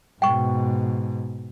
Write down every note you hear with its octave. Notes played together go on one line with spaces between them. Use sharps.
G#2 B2 G5 C#6